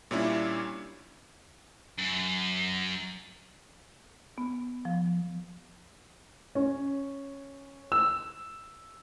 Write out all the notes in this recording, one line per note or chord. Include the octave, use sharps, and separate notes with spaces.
A#2 G3 C#4 D4 E4
F#2
B3
F3
C#4
E6